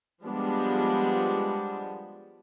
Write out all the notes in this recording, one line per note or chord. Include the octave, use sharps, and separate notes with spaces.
F3 G3 G#3 B3 D4